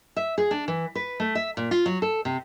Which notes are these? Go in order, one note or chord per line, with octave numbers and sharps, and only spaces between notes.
E5
G#4
D4
E3
B4
A3
E5
A#2
F4
F#3
A4
C3